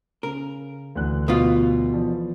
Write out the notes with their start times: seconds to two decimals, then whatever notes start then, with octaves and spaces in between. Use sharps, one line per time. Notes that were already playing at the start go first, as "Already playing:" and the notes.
0.23 C#3 A#4
0.96 D2 E3 F#6
1.28 B2 F4
1.93 E3 F3 D5